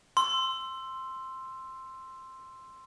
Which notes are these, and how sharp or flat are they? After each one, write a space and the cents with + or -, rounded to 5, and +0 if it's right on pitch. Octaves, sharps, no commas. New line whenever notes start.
C6 +0 E6 +15